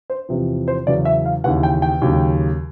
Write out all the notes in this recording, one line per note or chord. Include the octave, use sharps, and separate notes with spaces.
C5
E2 C3 F3
C5
E2 C#3 F#3 D5
E5
F5
D#2 C#3 E3 F#5
G5
G5
D#2 C#3 F#3